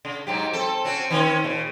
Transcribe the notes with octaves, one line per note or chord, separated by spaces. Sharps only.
C#3
G#2 F#3 G4
C4 A4
C4 C#4 F#4
D#3 C4 C#4
A#2 C#3